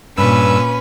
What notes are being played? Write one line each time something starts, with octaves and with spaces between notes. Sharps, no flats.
G2 A#2 C#4 B4 B5 E6